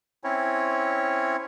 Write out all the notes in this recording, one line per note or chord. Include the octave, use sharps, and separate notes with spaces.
C4 C#4 E4 C#5